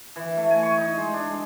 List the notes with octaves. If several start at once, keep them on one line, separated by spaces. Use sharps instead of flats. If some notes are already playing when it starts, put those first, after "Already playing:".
E3
A3
G#5
C#6
D#4
G#3
D4
G#3